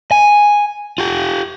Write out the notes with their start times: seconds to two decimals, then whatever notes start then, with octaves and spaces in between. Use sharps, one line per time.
0.11 G#5
0.98 F4 G4